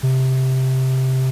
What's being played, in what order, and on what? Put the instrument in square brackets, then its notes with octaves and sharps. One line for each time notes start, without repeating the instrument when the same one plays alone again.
[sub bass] C3